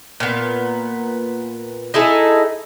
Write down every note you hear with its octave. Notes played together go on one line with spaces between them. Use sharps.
A#2 B3
D#4 E4 G#4 A4